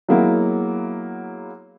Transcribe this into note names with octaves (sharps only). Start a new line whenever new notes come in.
F#3 G#3 A#3 B3 E4